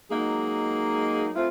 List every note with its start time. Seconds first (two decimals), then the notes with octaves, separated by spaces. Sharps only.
0.10 F#3 G#3 A#3 D#4 G#4
1.35 A3 C4 E4 F4